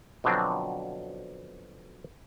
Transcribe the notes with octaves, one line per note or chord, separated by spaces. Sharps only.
B2 D3 F3 F#3 C4 D4